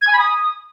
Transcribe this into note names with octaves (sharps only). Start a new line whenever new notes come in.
G#6
G#5
B5
D#6